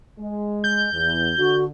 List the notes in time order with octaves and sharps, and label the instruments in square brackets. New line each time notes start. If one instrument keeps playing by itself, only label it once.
[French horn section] G#3
[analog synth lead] G6
[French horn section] E2
[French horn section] D3 [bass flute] F#4